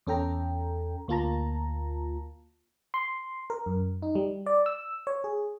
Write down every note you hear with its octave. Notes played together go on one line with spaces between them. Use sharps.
E2 C#4 A4 G5 A#5
D2 A#3 F4 A5 A#5
C6
A#4
F#2
D#4
G3
D5
E6
C#5
G#4